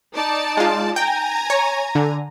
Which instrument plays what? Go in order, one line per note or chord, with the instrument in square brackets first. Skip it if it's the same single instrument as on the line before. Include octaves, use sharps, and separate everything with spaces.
[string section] D#4 D5 A5
[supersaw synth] G#3 F4
[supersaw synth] G5 [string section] G#5 A#5
[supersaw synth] C#5
D3